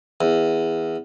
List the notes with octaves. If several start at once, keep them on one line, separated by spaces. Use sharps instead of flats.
E2